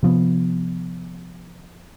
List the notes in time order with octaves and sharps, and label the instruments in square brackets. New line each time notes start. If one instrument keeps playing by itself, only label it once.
[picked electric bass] C3 F3 B3